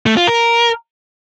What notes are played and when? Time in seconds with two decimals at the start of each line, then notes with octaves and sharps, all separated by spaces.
0.06 A3
0.17 F4
0.27 A#4